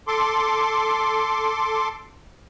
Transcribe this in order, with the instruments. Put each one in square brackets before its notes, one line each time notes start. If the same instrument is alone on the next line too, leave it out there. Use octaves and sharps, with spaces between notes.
[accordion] A4 C6 D6